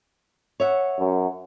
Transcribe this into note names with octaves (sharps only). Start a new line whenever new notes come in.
C#5 E5 F#5
F#2